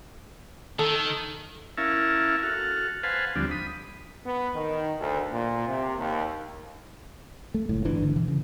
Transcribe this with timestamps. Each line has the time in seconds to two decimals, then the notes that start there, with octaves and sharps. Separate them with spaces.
0.79 D#3 A4
1.78 C#4 E4 A#4 E5 F5 A5
2.43 F#4 A4 F6
3.03 B4 C5 F5 F#5 G#5 A5
3.36 D2 F3 G3 C4 D4
3.51 B5 D#6
4.25 B3
4.55 D#3
4.99 D2
5.31 A#2
5.67 C3
5.97 D#2
7.54 A3
7.69 F#1 A2
7.85 G1 E3 D4
8.03 D3
8.16 B2 E3
8.28 C#3